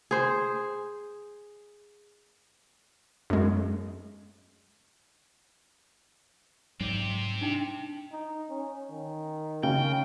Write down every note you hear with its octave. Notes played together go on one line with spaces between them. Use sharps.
G#4 C5
F#2 G#3
G#2 F#3 G3 C4 G4
D4 D#4 G5
D#4
C#4
D#3
C#3 G5